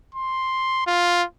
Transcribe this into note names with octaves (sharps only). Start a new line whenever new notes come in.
C6
F4